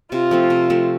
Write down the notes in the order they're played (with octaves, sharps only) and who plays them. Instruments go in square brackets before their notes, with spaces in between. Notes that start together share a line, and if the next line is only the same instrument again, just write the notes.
[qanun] C3 [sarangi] F4
[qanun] F3 A3 C4
C3
F3 A3 C4